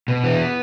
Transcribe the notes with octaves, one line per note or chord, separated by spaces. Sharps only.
B2
E3 B3